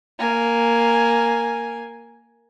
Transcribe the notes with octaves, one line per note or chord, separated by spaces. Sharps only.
A#3 G#5